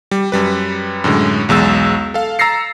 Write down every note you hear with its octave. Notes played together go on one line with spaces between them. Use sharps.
G3
F#2 G3 B4
F#2 A2 D3 G#3
B1 E2 G#3 E6 A6
A4 F5
A#5 E6 A6 A#6 C7 C#7